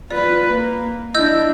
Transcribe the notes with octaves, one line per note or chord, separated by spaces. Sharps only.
F4 B4 D5
A#3
D4 E4 D#5 E6 G6